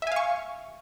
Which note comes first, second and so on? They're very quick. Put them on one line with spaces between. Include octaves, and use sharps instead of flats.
E5 G#5 F5 C#6